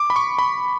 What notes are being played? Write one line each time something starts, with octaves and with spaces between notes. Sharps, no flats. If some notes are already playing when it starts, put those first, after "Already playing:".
Already playing: D6
B5
C#6
B5